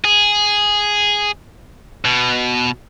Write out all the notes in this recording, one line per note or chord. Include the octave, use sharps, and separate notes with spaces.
G#4
B2